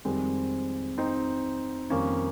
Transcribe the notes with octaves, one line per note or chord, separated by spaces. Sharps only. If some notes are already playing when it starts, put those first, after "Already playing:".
F2 D#3 G3 G#3 C4
C4 D#4
F2 D#3 G3 A#3 C#4